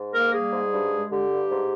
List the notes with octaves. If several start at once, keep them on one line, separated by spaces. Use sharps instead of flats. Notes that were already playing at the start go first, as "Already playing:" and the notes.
Already playing: G#2
A#3 A#4
G3 G#4
G#2
G2
G#3
D3 G4
G2
G#2